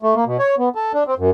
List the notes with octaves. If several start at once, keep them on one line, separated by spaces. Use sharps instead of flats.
A3
A#3
B2
C#5
B3
A4
D4
C4
F#2